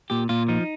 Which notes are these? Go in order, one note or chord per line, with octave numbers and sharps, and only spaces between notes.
A#2 G4
A#2 F4
F3 D#4